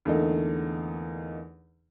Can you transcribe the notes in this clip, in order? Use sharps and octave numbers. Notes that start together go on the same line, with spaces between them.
E2 D3 A3 A#3 D#4